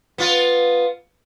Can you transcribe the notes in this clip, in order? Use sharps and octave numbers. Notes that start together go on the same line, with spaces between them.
B3 F4